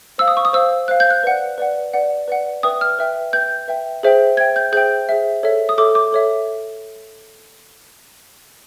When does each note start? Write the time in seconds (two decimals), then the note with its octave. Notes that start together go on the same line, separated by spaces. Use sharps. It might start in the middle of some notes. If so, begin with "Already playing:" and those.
0.18 C5 F5 E6
0.28 D#6
0.37 C#6
0.45 D#6
0.53 C5 F5 E6
0.88 C5 F5 F#6
1.00 G6
1.10 F#6
1.23 B4 D5 F#5
1.58 B4 D5 F#5
1.94 B4 D5 F#5
2.28 B4 D5 F#5
2.63 B4 E5 G5 D#6
2.81 F6
2.99 B4 E5 G5
3.33 B4 E5 G5 G6
3.68 B4 E5 G5
4.03 G#4 C5 E5 G5
4.37 G#4 C5 E5 G5 G#6
4.56 G6
4.73 G#4 C5 E5 G5 G6
5.08 G#4 C5 E5 G5
5.43 A4 C#5 E5
5.69 D#6
5.78 A4 C#5 E5 D6
5.95 D6
6.12 A4 C#5 E5